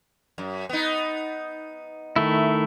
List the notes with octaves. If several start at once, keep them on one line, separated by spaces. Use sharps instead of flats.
F#2
B3 D#4
D#3 A3 E4